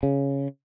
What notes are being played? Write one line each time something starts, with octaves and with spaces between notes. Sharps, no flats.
C#3